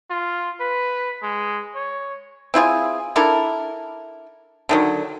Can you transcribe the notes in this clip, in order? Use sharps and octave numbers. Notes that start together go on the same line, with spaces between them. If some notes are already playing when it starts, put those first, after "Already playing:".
F4
B4
G#3
C#5
C4 E4 F4 G#4
D4 E4 A4 A#4
D3 D#3 F#3